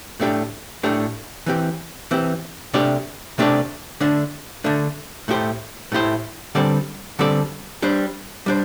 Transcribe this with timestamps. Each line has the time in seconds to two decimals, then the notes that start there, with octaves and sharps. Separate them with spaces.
0.20 A2 A3 D4 G4
0.83 A2 A3 D4 G4
1.46 E3 C4 G4
2.11 E3 C4 G4
2.73 C3 A3 D4 G4 D5
3.38 C3 A3 D4 G4 D5
4.00 D3 A3 D4
4.64 D3 A3 D4
5.28 A2 A3 E4 G4 C5
5.92 A2 A3 E4 G4 C5
6.55 D3 G3 C4 A4 D5
7.19 D3 G3 C4 A4 D5
7.82 G3 D4 C5
8.46 G3 D4 C5